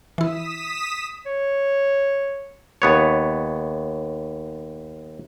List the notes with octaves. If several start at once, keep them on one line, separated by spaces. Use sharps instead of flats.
E3 E4 D#6 B6 E7
C#5
D#2 B3 C#5